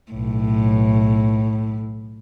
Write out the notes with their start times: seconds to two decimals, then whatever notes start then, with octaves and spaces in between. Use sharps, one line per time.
0.12 B1 A2